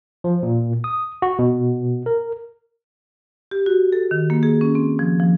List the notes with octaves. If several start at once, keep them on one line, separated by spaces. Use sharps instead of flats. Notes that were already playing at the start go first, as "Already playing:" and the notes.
F3
A#2
D#6
F#4
B2
A#4
G4
F#4
A4
D#3
A#3
G#4
C#4
C4
F3
F3